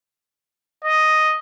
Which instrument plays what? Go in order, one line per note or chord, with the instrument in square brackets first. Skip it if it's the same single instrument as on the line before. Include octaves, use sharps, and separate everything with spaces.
[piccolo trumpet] D#5